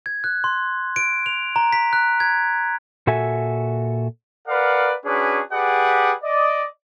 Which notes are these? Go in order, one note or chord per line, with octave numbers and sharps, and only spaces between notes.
G#6
F#6
C6
D7
F7
A#5
B6
F#6
G#6
A#2 F#4 A4 E5 G#5
A#4 B4 D5 F5 F#5
C#4 D4 F#4 G#4 B4
G4 G#4 B4 D5 F#5
D5 D#5